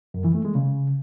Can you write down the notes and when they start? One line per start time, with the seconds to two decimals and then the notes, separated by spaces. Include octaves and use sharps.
0.14 F#2
0.24 E3
0.35 A3
0.45 G#3
0.55 C#3